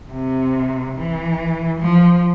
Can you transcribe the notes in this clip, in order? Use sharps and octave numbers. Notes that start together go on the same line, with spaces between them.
C3
E3
F3